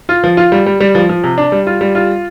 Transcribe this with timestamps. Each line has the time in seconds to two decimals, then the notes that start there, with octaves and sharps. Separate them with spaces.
0.09 F4
0.24 F3
0.37 F4
0.52 G3
0.66 G3
0.81 G3
0.95 F3
1.09 F3
1.24 C3
1.38 D4
1.52 G3
1.67 F4
1.81 G3
1.95 F4